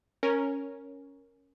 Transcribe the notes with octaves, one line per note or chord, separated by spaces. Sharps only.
C#4 A#4